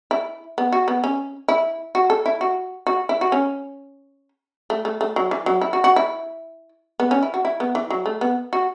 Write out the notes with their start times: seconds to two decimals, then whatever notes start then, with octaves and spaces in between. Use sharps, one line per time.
0.11 E4
0.58 B3
0.73 F#4
0.88 B3
1.04 C#4
1.48 E4
1.95 F#4
2.10 A4
2.26 E4
2.41 F#4
2.87 F#4
3.09 E4
3.21 F#4
3.32 C#4
4.70 A3
4.85 A3
5.01 A3
5.16 F#3
5.31 E3
5.46 F#3
5.61 E4
5.73 F#4
5.84 F#4
5.96 E4
7.00 B3
7.11 C#4
7.23 E4
7.34 F#4
7.45 E4
7.60 B3
7.75 E3
7.90 F#3
8.06 A3
8.21 B3
8.53 F#4